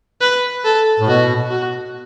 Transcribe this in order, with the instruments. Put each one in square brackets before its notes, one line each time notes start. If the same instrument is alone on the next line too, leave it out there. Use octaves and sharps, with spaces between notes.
[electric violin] B4
A4
[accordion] A2
[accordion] B2 [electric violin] F#4
[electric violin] F#4